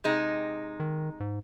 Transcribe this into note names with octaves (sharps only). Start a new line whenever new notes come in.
C3 G#3 D#4
D#3
G#2